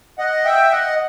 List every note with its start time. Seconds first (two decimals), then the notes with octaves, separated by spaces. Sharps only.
0.18 D#5 F#5
0.45 E5 G5
0.72 D#5 F#5